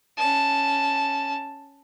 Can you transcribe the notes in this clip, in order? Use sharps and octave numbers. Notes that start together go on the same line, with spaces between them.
C#4 A5